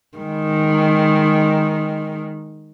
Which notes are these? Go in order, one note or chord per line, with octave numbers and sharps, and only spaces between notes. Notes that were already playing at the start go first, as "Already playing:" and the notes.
D#3 G#3